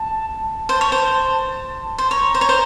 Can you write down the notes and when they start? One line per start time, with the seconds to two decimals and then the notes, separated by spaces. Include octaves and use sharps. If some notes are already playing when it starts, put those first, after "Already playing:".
Already playing: A5
0.69 C5 A5
0.81 C#5
0.92 C5
1.98 C5
2.11 C#5 A#5
2.35 C5
2.41 C#5
2.49 C5